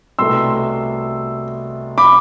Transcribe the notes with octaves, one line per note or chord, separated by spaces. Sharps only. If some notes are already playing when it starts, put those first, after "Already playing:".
C2 B2 A3 C6 E6
B5 D6